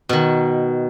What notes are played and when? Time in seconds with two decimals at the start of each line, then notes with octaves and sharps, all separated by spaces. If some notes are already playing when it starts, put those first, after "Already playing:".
0.09 B2 D#3